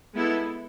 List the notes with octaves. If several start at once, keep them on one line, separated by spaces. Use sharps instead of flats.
G#3 B3 E4 A4